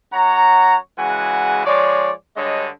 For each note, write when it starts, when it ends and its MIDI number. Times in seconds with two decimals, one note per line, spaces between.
0.13 0.76 42
0.13 0.76 73
0.13 0.76 78
0.13 0.76 82
0.98 1.63 49
0.98 1.63 52
0.98 1.63 56
0.98 1.63 66
0.98 1.63 78
0.98 1.63 80
1.66 2.11 53
1.66 2.11 56
1.66 2.11 73
1.66 2.11 74
2.36 2.68 43
2.36 2.68 50
2.36 2.68 56
2.36 2.68 73
2.36 2.68 75